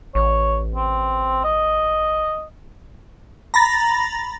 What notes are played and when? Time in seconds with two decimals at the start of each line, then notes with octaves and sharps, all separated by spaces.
0.15 A1 C#5
0.76 C4
1.44 D#5
3.54 A#5 B5 A6 A#6